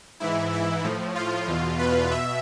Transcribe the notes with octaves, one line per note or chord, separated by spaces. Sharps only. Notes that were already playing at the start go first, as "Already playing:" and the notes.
G#2 E3 E4
E4
A2 F3
F4
E2 B2
B4
B2 E5